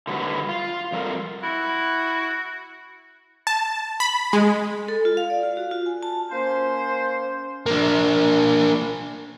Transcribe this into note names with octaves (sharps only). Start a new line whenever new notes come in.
D3 D#3 F#3 G3 F#4 B4
F4
F2 G3 A4 A#4
E4 F#4
A5
B5
G#3
A4
F4
F5
D5
F4
F#4
F4
G#5
A5
A#3 C#4 C5
A#3 D4